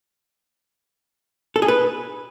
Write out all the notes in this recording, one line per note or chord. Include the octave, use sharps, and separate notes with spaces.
A4
G#4
B4